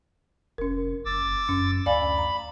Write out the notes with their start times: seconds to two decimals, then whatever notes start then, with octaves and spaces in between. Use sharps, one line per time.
0.58 F1 C#4 A#4
1.05 F#1 D6 E6 A6
1.49 F#2 C#4
1.86 D2 D5 F5 G#5 B5
2.18 A#5